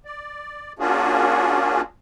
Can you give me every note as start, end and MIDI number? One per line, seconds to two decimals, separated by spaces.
0.05 0.73 74
0.79 1.81 58
0.79 1.81 61
0.79 1.81 62
0.79 1.81 65
0.79 1.81 66
0.79 1.81 68